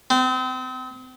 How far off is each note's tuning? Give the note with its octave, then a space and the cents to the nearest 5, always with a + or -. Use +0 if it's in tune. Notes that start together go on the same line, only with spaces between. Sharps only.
C4 -35